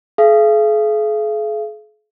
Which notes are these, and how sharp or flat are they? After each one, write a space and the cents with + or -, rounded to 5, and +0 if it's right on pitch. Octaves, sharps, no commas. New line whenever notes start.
G#4 +45 F5 -45